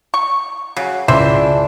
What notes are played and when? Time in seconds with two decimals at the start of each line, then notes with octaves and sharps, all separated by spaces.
0.14 C#6
0.77 C#3 F#3
1.08 C#2 E3 D4 C5 E5